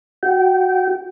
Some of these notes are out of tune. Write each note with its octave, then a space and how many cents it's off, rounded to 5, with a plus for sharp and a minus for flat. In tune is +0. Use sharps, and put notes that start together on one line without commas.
F#4 +0 G5 -25